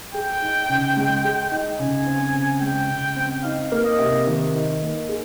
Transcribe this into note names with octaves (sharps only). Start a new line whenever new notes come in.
G#4 G5
D#4
C#3
G#3
G#4
D#4
C#3 G#5
C4
C#3
G#3 G5
C#3
C4
D#4 F5
A#3
D#5
C3
D#3
D#4
A#3
G#4